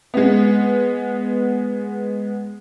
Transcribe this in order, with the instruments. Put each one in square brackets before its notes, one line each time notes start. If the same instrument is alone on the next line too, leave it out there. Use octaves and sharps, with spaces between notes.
[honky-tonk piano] G#3 B3